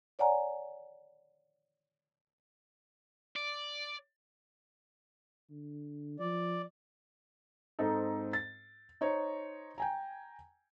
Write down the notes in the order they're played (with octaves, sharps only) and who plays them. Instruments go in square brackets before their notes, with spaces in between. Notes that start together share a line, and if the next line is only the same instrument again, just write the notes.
[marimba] C#5 D5 F#5 G#5 A#5
[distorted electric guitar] D5
[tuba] D3
[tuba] F3 [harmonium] D5
[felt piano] G#2 C4 D#4 A4
A6
D#4 C5 C#5
G5 G#5 A#5